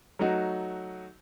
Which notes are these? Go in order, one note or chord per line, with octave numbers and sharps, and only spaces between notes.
F#3 A3 D#4 F#4